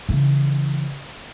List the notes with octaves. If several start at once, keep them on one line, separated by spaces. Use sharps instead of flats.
C#3 E3